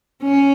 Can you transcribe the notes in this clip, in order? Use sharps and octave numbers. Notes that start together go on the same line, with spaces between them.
C#4